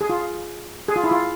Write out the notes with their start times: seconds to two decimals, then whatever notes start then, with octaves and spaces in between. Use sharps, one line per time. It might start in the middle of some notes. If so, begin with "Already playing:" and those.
0.01 G#4
0.10 F4
0.88 G#4
0.96 F4
1.04 E4
1.11 F4